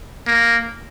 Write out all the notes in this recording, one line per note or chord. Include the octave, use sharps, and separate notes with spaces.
A#3